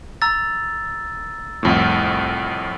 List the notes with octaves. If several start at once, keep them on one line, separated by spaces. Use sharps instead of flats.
A#5 E6 A6
C2 F2 A2